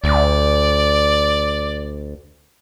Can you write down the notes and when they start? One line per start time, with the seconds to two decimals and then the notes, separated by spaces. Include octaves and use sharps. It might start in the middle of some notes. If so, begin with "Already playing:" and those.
0.04 D2 D5